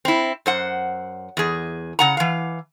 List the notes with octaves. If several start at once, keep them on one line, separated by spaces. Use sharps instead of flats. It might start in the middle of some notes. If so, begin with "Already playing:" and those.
C4 E4
F#2 C5 F#5
E2 G#4
C#3 F#5 A#5
E3 F5